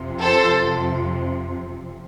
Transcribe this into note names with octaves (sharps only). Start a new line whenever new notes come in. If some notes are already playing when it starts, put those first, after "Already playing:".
Already playing: F2 C3 F3
A4 C5